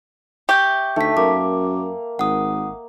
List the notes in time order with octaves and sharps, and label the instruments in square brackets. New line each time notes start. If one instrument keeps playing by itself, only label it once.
[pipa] G4 [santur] E5 [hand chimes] C#6 G6
[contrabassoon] D2 [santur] A3 [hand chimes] D#4 B6
[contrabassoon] F#2 [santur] A#3 [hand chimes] D6
[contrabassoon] G#1 [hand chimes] F#5 D#6